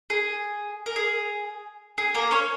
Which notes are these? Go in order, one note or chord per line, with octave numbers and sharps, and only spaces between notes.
G#4
A#4
G#4
G#4
A#3 A#4
C#4 C#5